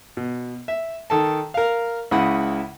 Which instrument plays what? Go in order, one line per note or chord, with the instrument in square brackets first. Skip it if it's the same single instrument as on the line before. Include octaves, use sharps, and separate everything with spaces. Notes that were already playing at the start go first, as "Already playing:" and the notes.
[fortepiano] B2
E5
D#3 A4 A5
A#4 F5
C#2 C#3 E4 F#5 B5